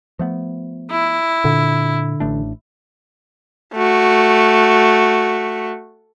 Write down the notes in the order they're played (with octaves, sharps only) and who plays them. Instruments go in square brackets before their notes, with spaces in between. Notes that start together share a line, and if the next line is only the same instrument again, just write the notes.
[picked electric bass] F3 A3 B3
[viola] E4
[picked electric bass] A#2 [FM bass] D3
[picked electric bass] A1 A3 D4
[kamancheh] A3 F#4